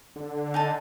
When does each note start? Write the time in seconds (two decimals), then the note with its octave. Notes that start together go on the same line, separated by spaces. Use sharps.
0.16 D3
0.54 D#4 G#5 A5